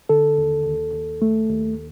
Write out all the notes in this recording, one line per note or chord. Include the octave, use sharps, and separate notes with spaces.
D3 A4
D#2
D#2
D#2
A3
D#2